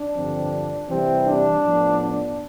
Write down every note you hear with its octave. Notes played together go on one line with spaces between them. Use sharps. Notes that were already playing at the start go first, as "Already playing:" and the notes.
Already playing: D4
G2 D3 F3 C4
C3 E3 G3 C4
D4
A2 F3 B3
D4